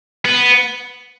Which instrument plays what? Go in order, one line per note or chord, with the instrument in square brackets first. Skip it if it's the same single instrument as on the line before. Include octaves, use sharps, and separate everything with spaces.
[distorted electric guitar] B3